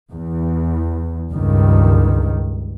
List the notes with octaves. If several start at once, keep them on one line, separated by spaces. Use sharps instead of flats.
E2
C#2 G2 D#3